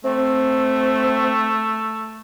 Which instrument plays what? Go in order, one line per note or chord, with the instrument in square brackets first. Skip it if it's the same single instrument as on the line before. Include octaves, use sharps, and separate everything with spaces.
[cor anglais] A3 [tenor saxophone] C4